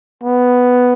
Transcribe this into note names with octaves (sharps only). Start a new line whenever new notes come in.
B3